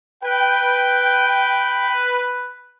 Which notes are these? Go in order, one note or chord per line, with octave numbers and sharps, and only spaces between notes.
B4 G5